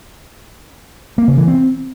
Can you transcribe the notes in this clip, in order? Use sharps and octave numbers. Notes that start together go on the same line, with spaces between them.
A#3
C#3
E3
C4